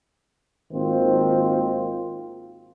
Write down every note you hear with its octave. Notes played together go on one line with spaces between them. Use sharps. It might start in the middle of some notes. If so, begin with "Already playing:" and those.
G#1 D#3 A#3 C4 F4 C5